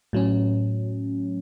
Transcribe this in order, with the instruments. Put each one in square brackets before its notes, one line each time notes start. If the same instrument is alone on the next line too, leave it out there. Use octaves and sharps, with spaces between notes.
[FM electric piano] A2 F#3 C#4